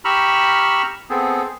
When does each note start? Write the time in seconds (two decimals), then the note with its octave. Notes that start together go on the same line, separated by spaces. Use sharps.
0.05 G4 A#5 B5 C#6 E6 F6
1.10 B3 C4 G#4 A4